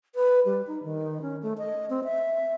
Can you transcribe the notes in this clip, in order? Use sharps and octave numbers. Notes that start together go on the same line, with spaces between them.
B4
G3
D#4
D#3
C#4
A3
D#5
C4
E5